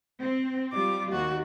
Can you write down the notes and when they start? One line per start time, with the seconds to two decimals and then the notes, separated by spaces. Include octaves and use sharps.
0.21 C4
0.73 G3 F4 D6
1.12 D#2 F#4